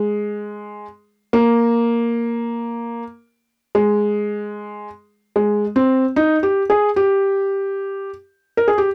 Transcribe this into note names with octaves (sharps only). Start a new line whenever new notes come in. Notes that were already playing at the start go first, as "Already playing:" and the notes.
Already playing: G#3
A#3
G#3
G#3
C4
D#4
G4
G#4
G4
A#4
G#4
G4